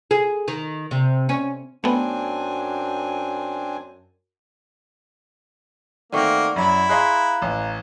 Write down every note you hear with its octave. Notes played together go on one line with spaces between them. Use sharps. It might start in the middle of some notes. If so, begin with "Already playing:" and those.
G#4
D#3
C3
C#4
F#2 A3 B3 C4 D4 G#5
D#3 A3 A#3 C4 D5 F#5 C#6
F#2 F#3 E4
G#4 D#5 F5 A#5 C6 F#6
A1